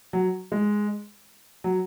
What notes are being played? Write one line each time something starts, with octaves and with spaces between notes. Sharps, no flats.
F#3
G#3
F#3